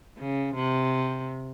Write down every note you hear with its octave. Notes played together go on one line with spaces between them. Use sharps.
C#3
C3